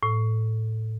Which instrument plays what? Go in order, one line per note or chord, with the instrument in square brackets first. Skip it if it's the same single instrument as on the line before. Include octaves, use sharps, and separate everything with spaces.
[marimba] A2